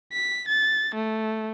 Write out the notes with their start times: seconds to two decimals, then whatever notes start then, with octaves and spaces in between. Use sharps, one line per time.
0.13 B6
0.48 A6
0.94 A3